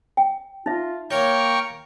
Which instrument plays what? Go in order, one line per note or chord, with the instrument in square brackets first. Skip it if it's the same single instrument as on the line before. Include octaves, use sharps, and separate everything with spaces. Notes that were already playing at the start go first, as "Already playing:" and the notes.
[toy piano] G5
[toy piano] D#4 E5 [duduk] F4
[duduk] A#3 [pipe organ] A#4 G5 C#6 [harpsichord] C#5